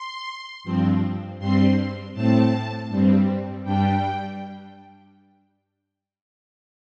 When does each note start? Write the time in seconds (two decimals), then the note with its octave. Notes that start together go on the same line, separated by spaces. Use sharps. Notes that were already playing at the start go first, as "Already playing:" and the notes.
Already playing: C6
0.64 G2 F3 C4
1.39 G2 G3 C4 C6
2.14 A2 A3 C4 A5
2.89 G2 G3 C4
3.64 G2 G3 D4 G5